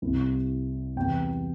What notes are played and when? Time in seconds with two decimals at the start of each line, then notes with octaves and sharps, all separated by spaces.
0.02 C2 C3 G3 C4 E4
0.96 E2 C3 G3 G5